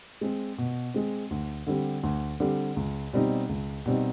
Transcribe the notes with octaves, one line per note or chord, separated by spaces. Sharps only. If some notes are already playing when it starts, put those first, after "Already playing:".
G#3 C4
B2
G#3 C4
D2
D3 G3 C4
D2
D3 G3 C4
C#2
B2 G3 C4 D#4
C#2
B2 G3 C4 D#4